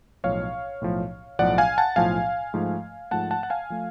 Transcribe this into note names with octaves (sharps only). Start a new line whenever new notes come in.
B1 A2 F3 C#5 F5
B1 A2 F3
B1 A2 F3 D5 F#5
F5 G#5
F#5 A5
B1 A2 F3 F5 G#5
G#2 F3 A3
G#2 F3 A3 F#5 A5
F#5 A5
F#5
F5 G#5
F3 A3